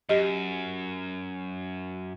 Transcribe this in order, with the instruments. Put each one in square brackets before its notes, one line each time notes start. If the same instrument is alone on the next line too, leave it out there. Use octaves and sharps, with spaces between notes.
[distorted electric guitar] F#2 [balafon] G4 D#5